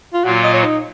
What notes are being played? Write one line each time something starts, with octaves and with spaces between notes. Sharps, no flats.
F4
A#2 F#3 A#3 F4 F#4
D#5
C#5
D#4